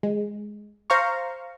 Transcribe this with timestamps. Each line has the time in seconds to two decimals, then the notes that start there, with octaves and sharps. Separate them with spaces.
0.03 G#3
0.90 C5 F5 A#5 C#6